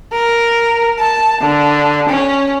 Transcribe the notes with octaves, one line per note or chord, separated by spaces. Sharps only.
A#4
A5
D3
C#4